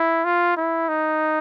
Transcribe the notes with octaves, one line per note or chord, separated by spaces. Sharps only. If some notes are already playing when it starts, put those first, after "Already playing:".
Already playing: E4
F4
E4
D#4